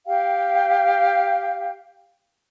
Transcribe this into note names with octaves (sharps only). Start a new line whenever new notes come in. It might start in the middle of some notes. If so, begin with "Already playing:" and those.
G4 F5 G5